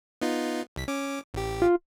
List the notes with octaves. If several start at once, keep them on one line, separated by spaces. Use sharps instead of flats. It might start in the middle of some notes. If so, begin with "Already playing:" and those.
B3 D#4 F4
C2 B6
C#4 D6
A1 G4
F4